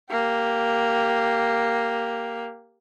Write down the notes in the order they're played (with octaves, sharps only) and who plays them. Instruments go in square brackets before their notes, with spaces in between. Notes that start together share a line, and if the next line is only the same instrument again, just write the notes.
[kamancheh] A#3 G4